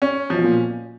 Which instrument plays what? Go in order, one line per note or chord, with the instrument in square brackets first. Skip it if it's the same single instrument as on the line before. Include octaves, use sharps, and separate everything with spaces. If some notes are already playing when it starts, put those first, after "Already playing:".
[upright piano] C#4
[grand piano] B2 [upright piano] F3
[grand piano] A#2